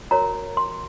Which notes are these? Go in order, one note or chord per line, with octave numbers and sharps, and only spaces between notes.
F#4 A#4 C#5 A#5
C6